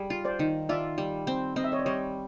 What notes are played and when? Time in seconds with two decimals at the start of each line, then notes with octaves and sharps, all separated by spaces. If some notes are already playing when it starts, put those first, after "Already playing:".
Already playing: G3 G#4
0.10 F4
0.25 C5 D5
0.39 D#3
0.69 F4 D5 E5
0.98 G3
1.27 C4
1.56 C4 D#5
1.64 E5
1.72 C#5 D#5
1.79 D5
1.85 G3 C#5 D#5